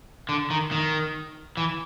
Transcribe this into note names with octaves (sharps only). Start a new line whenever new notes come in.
D3
D#3
D#3
E3